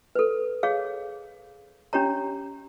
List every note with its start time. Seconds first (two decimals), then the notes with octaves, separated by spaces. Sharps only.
0.15 A4 B4
0.63 G#4 C#5 F5
1.93 C#4 D4 G4 C#5 A#5